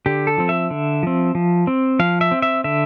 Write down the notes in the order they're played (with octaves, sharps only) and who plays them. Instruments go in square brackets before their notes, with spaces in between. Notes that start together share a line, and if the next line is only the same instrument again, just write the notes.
[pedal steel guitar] D3 G4
A4
F3 C4
E5
D3
F3 C4
F3
C4
F3 F5
E5
C4
E5
D3 E5